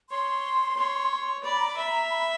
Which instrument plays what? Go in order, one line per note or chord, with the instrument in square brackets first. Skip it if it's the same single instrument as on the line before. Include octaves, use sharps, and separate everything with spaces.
[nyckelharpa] C#5 [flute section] C6
[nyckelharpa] C#5
[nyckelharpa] D5 [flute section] B5
[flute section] A#5
B5
[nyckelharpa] E5
[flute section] A#5
B5